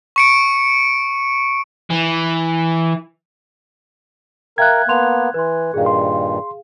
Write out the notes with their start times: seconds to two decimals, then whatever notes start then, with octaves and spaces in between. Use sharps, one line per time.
0.16 C#6 C#7 D7
1.90 E3
4.58 A#4 E5 F5 G5 F#6 G#6
4.88 A#3 B3 A5 C6 F7
5.34 E3 B4 C6
5.74 G2 A#2 D#3 G#4 F5
5.86 C6